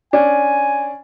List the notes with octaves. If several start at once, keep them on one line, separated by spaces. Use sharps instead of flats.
C#4 D4 G#5